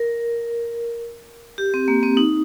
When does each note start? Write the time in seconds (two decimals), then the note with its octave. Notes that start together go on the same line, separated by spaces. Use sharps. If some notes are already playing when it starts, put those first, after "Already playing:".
Already playing: A#4
1.58 G4
1.74 C4
1.88 A#3
2.03 C4
2.17 D#4